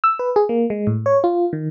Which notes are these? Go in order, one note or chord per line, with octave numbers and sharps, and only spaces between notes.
E6
B4
G#4
A#3
G#3
A2
C#5
F4
D#3